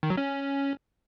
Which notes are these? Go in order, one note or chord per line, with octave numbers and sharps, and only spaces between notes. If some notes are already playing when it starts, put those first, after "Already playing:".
D#3
F#3
C#4